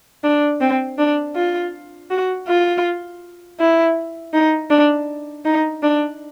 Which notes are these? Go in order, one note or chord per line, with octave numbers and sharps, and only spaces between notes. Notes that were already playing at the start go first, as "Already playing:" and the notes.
D4
C4
D4
F4
F#4
F4
E4
D#4
D4
D#4
D4